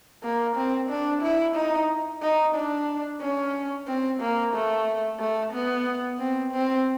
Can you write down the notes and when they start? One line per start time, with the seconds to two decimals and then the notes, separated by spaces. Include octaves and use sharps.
0.24 A#3
0.57 C4
0.90 D4
1.23 E4
1.56 D#4
2.22 D#4
2.55 D4
3.21 C#4
3.88 C4
4.20 A#3
4.54 A3
5.20 A3
5.53 B3
6.19 C4
6.52 C4